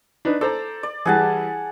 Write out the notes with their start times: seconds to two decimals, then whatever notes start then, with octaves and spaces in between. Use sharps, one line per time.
0.25 D4 D#4 B4
0.41 A4 C5 D5 A#5
0.83 D5
1.05 E3 G3 G#4 F#5 A5